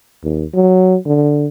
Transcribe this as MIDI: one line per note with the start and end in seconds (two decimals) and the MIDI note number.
0.24 0.45 39
0.54 0.96 54
1.06 1.47 50